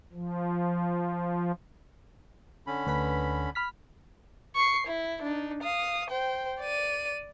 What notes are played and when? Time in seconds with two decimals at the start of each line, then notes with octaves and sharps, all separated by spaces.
0.13 F3
2.67 D3 C#4 B5
2.87 D2 B4 B6
3.55 B5 F6 B6
4.56 C#6 C7
4.87 E4
5.23 D4 D#4
5.63 F5 D#6
6.10 C5 G5
6.61 D5 D#7